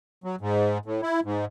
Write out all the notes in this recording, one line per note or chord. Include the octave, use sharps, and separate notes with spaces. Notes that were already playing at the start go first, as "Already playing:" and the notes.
F#3
G#2
A2
E4
G#2